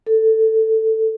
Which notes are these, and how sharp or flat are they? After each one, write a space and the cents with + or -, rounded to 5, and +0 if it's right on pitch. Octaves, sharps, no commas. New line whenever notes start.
A4 +10